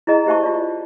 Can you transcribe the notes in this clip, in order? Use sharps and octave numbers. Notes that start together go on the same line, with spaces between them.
E4 G#4 D#5 A#5
E4 G4 C5 E5 A5 C#6
F4 D5